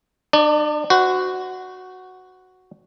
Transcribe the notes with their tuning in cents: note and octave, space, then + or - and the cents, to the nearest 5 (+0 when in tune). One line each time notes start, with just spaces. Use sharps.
D4 +40 D5 +0
F#4 +0 C5 -35